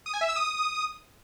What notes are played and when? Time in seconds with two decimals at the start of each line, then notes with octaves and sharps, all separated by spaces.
0.06 D#6
0.13 G#5
0.21 E5
0.29 E6
0.36 D#6